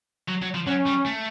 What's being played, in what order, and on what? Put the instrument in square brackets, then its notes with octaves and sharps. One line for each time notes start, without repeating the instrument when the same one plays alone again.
[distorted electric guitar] F#3
F#3
F3
[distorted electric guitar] F#3 [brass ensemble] C#4
[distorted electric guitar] G3
A3